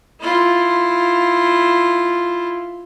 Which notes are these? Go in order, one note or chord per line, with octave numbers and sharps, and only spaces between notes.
E4 F4